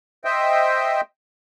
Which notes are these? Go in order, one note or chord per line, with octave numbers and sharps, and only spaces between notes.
C5 D#5 E5 G5